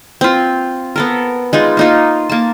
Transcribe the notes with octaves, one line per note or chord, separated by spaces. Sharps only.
C4 F4
B3 A4 A#4
G#3 D#4 F4
A#3 D#4 F4
A#3 A5